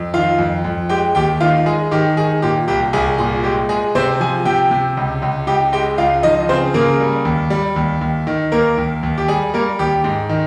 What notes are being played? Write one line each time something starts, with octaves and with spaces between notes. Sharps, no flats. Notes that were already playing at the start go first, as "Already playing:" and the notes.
Already playing: F2
D#3 F4 F5
F2
F2
G#3 G4 G5
D#2 G4 G5
D#3 F4 F5
G#3 G#4
D#3 G4
D#3 G#4
A#2 G4
C2 G4
C2 G#4
A#2 G#4
G#3 G4
G#3 G#4
C3 C4 C5
F3 G#4 G#5
C3 G4 G5
C3
C#2
C#2
C#2 G4 G5
G#3 G4 G5
C#2 F4 F5
F3 D#4 D#5
C#3 C4 C5
C#3 A#3 A#4
G3
D#2
G3
D#2
D#2
D#3
D#2 A#3 A#4
D#2
D#2
G4
G3 G#4
G3 A#3 A#4
D#2 G4
G#2
D#3